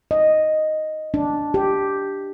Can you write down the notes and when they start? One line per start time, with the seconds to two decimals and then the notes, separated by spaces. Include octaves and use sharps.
0.11 D#5
1.14 D4
1.54 G4